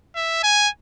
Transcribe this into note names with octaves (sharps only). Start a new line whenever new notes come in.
E5
G#5